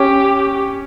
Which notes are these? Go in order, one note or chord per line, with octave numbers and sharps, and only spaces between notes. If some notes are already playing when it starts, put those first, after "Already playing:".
Already playing: C#4 G4